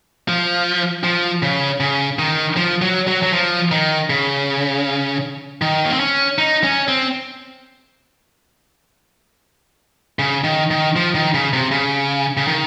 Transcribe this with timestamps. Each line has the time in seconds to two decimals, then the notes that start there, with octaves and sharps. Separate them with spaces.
0.28 F3
1.04 F3
1.43 C#3
1.80 C#3
2.19 D#3
2.57 F3
2.82 F#3
3.07 F#3
3.23 F#3
3.33 F3
3.72 D#3
4.10 C#3
5.62 D#3
5.86 A#3
5.93 C4
6.00 C#4
6.38 D#4
6.64 C#4
6.88 C4
10.19 C#3
10.44 D#3
10.71 D#3
10.96 F3
11.15 D#3
11.34 C#3
11.53 C3
11.71 C#3
12.37 C#3
12.48 D#3